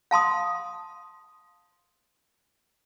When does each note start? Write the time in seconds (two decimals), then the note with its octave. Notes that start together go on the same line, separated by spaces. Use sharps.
0.11 F5 A5 C6 D#6